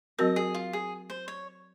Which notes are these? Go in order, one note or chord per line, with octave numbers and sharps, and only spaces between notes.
F#3 C4 F#4 A#4 D#5
G#4
F4
G#4
C5
C#5